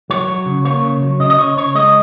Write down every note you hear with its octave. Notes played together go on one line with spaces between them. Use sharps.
F#3 C#5
F#3
C#3
A#3 C#5
C#3
F#3
C#3 D#5
D#5
C#3 C#5
C#3 C#5
G#3 D#5